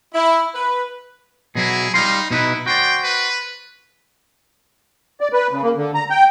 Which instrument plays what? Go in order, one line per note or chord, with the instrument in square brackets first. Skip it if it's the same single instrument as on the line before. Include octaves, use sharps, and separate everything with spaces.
[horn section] E4
B4
[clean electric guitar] B2 F#3 E4 [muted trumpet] G#4
[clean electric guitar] G3 F5 C6 [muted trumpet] D#4
[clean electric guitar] B2 D#4 B4 [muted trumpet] E4
[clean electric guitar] F#4 C5 D5 [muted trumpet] G5
[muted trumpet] B4
[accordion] D5
B4
C#3
A#3
D3
A#5
G5